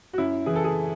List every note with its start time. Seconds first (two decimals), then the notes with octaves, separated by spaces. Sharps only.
0.13 F#4
0.18 F#2 E4
0.46 E3 G#4
0.56 A4
0.64 G#4